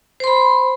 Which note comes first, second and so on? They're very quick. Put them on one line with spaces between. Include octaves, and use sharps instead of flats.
C5 C6 B5